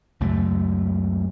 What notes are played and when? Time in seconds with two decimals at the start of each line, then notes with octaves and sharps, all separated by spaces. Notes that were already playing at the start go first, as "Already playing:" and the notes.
0.20 C#2 F#2 A3